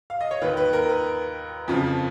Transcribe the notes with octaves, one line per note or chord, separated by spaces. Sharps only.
F5
D#5
C#5
D#2 D#3 B4
B4
A#4
B4
F2 C#3 F3